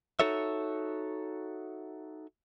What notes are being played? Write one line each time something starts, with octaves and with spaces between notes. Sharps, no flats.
D#4 F#4 A4 C#5 E5